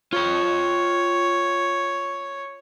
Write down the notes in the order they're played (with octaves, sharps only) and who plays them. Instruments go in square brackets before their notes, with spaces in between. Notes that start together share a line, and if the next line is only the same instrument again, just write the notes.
[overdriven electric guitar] F4 G5 [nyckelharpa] C#5